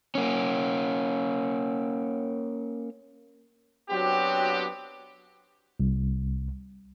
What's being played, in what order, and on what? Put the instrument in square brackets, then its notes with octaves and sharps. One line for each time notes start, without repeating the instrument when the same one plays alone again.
[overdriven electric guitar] A#3 C#4
[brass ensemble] F#3 B3 C4 D4 F#4 G4
[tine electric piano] C2